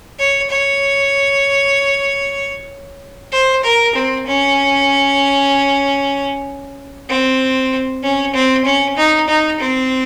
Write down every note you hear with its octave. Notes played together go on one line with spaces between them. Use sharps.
C#5
C#5
C5
A#4
C4
C#4
C4
C#4
C4
C#4
D#4
D#4
C4